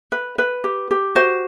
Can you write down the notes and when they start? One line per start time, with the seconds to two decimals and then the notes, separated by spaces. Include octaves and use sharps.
0.12 B4
0.38 B4
0.64 G4
0.91 G4
1.15 F#4 C5